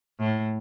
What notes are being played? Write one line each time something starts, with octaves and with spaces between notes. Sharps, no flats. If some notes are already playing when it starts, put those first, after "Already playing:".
A2